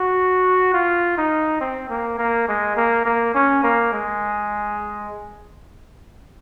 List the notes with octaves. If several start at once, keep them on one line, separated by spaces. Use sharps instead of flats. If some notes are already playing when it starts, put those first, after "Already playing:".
Already playing: F#4
F4
D#4
C4
A#3
A#3
G#3
A#3
A#3
C#4
A#3
G#3